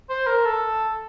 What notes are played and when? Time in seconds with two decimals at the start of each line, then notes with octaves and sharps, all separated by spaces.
0.10 C5
0.27 A#4
0.45 A4